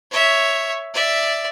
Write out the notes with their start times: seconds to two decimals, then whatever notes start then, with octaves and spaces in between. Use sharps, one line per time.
0.11 C#5 E5
0.94 D5 E5